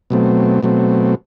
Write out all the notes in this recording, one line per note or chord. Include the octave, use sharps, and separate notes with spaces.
B2 F#3 A3 C4
B2 F#3 A3 C4